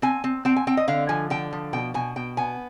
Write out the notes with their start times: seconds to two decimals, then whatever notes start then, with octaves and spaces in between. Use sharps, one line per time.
0.02 C4 G#5
0.24 C4
0.45 C4 G5
0.56 G#5
0.67 C4 G5
0.77 D#5
0.88 D3 F5
1.09 F3 G#5
1.30 D3 G5
1.53 F3
1.73 B2 G5
1.94 B2 G#5
2.16 B2 G5
2.37 B3 G#5